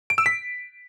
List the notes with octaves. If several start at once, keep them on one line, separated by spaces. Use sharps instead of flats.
D7
E6
B6